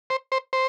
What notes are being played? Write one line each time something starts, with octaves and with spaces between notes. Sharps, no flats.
C5
C5
C5